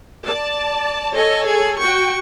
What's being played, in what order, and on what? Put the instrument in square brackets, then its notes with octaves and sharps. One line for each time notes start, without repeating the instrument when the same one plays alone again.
[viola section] D5 A5
[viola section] A4 C#5 G#5 [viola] D#5
[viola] G#4
[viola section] F#4 G5 [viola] C#6